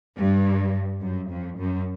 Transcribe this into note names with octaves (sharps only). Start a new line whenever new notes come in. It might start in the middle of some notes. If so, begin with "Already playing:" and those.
G2
F#2
F2
F#2